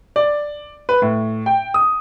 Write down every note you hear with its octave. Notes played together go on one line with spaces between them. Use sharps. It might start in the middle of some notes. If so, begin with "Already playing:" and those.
D5
B4
A2
G5
D#6